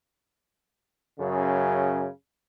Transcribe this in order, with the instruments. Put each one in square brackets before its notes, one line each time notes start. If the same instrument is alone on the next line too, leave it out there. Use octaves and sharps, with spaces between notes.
[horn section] F#2 C#3